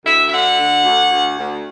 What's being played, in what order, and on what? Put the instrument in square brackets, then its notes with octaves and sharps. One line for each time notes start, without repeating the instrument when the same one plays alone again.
[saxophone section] D2 E5
E5
D3 F#5
D2
D2
D2
D2